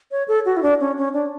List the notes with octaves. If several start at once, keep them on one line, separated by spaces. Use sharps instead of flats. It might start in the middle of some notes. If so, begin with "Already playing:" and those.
C#5
A4
F#4
E4
D4
C#4
C#4
D4